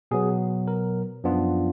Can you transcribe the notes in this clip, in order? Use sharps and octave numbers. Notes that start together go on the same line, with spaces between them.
B2 F#3 B3 G#4
A#4
F#2 F3 B3 D4 F4